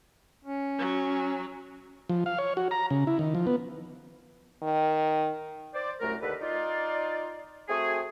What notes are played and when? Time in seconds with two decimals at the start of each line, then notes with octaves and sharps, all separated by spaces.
0.45 C#4
0.79 F#3
2.09 F3
2.26 F5
2.38 C#5
2.57 F#4
2.71 A#5
2.90 C#3
3.07 E4
3.19 D#3
3.35 F3
3.47 B3
4.62 D#3
5.74 C5 D5
6.01 C2 F#2 A3 A#4
6.22 D#2 D3 A4 B4
6.41 D#4 F4 D5
7.69 A3 C4 F#4 G#4